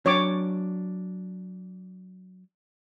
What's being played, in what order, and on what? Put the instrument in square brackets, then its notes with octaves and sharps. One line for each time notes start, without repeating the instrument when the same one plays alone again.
[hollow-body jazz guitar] F#3 D4 [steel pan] C#5 D6